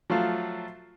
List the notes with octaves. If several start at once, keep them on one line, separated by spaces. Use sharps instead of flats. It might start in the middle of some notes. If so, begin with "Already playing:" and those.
F3 F#3 A3 F5